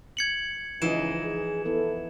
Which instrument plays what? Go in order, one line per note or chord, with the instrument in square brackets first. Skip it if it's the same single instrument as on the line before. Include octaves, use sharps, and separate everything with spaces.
[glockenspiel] G#6 C#7 F#7
[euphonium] C#2 [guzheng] E3 [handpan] F3 D#4 D#5 [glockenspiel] E7
[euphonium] G#4
[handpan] B3 E4 [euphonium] A4